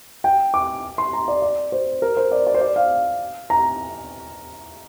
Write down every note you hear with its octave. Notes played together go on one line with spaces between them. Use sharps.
G5
D6
C6
A#5
D5
D5
C5
A#4
C5
D5
D5
C5
D5
F5
A#5